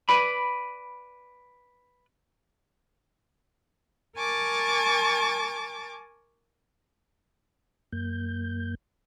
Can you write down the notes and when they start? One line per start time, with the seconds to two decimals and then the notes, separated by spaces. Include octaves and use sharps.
0.09 B4 D5 B5
4.16 A#4 G#5 A5 C#6 D6 A6
7.93 F#2 A#3 G6